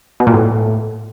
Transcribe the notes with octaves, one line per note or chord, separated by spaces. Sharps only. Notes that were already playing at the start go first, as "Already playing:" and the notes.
B2
A#2
A2